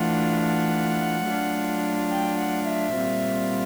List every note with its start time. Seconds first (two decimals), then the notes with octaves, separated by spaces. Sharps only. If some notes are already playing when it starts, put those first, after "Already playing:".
Already playing: E3 A3 D4 F4 F#5
0.41 F#5
1.26 F#3 A3 D4 F4
2.11 G5
2.39 F#5
2.68 E5
2.96 A#2 G3 C4 F4